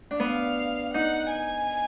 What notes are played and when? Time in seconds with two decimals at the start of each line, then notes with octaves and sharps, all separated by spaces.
0.11 D4
0.20 B3 F5
0.94 D#4 F#5
1.32 G#5